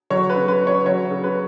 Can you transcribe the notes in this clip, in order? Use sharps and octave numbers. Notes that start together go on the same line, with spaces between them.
F#3 C#5
B4
C#3
B4
C#3
C#5
F#3 C#5
C#3
B4